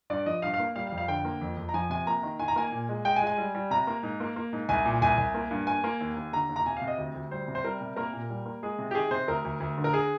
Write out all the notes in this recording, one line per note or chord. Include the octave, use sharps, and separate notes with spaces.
G2 D5
F3 D#5
G2 F5
F5
A#3
G3 F5
F5
F2
F5
D3 G5
A#3
F2
F2
A#5
F3 G#5
C3 G#5
A#3 A#5
D#3
D#3 G#5
A#5
A#3 G#5
A#2
G#3
G#3 G5
G#5
G#3
G#5
G3
G3
C3 A#5
A#3
G#2
A#3
A#3
G#2
C2 G#5
A#2
C2 G#5
C2
A#3
G2
A#3 G#5
A#3
D#2
D#2
D3 A#5
D#2
A#5
C3 G#5
F5
C3
D#5
D2
D2
G3 C5
C3
C5
G3 A#4
C3
A#3 A#4
A#2
G3
A#3
G#3 G#4
C3
G4
D#3 G#4
C3 C5
D2 A#4
D2
D2
D3
A#4
G#4